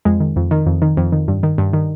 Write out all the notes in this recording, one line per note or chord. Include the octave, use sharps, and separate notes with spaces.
F2 G#3
D#3
F2
D#3
F2
D#3
F2
D#3
G2
D#3
G2
D#3